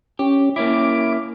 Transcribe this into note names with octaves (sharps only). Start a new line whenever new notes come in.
C#4 G4
A#3 C#4 E4 D6